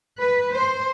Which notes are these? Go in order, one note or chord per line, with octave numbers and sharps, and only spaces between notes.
B4
C5